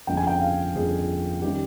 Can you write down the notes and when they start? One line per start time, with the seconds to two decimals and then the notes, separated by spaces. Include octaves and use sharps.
0.07 G1 F2 C#3 G5
0.17 G#5
0.27 G5
0.41 F5
0.75 G1 F2 C#3 G#4
1.42 D#3 G3 C#4 G4